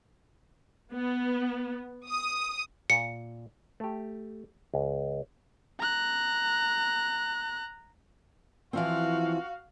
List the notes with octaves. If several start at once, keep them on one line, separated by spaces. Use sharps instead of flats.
B3
D#6
A#2 C#7
A3 G4
C#2
A#5 F#6
E3 F3 C4 F#4 F5